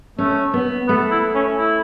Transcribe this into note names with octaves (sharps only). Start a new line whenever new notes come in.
A3 C#4
B3
A3 B3
E4
C#4
E4